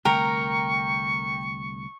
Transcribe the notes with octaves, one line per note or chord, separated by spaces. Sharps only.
C2 D3 A3 A#4 G5 A#5 C#6